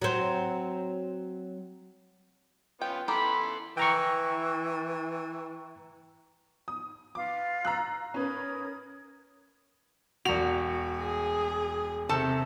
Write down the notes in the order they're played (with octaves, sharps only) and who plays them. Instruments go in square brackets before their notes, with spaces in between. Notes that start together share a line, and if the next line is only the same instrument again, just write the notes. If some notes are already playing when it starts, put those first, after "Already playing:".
[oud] F#3 C4
[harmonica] B3 C#4 F4 [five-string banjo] G5
[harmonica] E3 A4 C6 [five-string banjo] B3 G4 A#4 [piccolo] B5
[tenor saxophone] E3 [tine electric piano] G5 A#5 C#6
[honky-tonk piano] D#6
[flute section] F4 B4 F5 [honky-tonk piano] D6
[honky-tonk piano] A#5 E6 F#6
[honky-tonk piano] C#4 B4 [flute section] A#4 D#6 G#6
[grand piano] E1 F7 [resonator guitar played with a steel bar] F#4
[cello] G#4
[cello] C3 [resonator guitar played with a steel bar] D#3 A4 A5